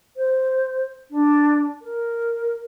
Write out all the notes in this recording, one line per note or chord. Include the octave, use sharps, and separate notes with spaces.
C5
D4
A#4